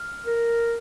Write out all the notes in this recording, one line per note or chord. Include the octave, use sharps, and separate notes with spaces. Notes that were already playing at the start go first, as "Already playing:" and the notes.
Already playing: F6
A#4